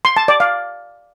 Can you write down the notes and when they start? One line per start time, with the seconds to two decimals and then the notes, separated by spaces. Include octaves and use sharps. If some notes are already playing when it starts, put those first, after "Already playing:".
0.05 C6
0.16 A5
0.28 D5
0.40 F5